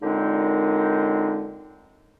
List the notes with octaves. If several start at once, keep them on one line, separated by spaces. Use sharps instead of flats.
F#2 A#2 D3 G#3 C4 D#4